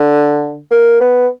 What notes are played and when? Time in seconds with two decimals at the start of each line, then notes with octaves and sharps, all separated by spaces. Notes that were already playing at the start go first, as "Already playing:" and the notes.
Already playing: D3
0.71 A#3
1.00 B3